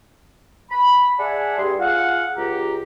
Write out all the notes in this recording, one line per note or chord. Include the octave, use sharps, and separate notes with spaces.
B5
G#4 D5 E5 F#5 G#5 A5
G2 G3 G#4 C6
F4 G#4 F5 F#5
C#2 G4 A#5